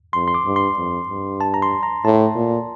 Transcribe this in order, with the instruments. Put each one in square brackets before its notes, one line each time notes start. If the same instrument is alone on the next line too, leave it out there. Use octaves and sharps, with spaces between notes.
[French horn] F2 [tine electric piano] C6
[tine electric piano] C6
D6
[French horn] G2
[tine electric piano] C6
[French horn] F2
G2
[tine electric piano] A5
A#5
C6
A#5
[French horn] A2 [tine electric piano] A5
[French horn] A#2